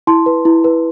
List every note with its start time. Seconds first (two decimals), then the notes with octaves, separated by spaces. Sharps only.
0.07 E4 A5 C6
0.26 B4
0.45 E4
0.64 B4